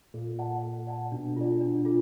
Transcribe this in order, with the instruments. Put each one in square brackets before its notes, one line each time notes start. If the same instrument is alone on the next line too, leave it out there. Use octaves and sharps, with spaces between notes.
[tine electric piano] A#2 [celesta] A4
[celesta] D5 F#5 A5
A4
D5 F#5 A5
[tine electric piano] B2 [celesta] D4
[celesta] F4 A4 D5
D4
F4 A4